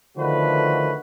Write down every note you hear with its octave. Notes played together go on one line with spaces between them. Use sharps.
D3 D#3 F3 A3 F#4 B4